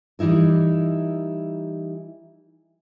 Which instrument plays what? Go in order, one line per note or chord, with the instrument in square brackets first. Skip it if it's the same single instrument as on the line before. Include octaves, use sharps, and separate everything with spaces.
[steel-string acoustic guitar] E3 G3 D#4 E4 A#4